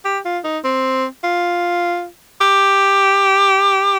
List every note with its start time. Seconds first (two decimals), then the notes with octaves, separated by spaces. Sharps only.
0.05 G4
0.25 F4
0.44 D#4
0.65 C4
1.24 F4
2.41 G4